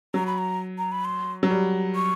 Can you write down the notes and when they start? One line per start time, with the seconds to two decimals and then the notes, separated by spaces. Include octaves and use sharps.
0.14 F#3 A#5
0.27 B5
0.38 A#5
0.78 A#5
0.92 B5
1.05 C6
1.43 F#3
1.50 G3
1.95 C#6